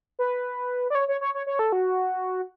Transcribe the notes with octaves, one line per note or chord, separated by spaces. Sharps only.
B4
D5
C#5
C#5
C#5
C#5
C#5
A4
F#4